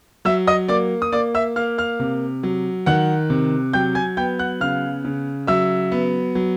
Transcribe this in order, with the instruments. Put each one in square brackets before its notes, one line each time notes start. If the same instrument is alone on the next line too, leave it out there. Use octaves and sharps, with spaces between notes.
[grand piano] F#3 E5 E6
D#5 D#6
A#3 D5 D6
D#6
A#3 D5 D6
E5 E6
A#3 F5 F6
F5 F6
C3
F#3
D#3 F#5 F#6
C3
F#3 G5 G6
G#5 G#6
B3 G5 G6
F#5 F#6
C#3 F5 F6
C#3
F#3 E5 E6
B3
F#3